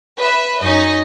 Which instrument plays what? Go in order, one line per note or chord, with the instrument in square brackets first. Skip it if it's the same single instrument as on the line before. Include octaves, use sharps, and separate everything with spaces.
[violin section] B4 E5
[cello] F#2 C#4 [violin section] D#4 D#5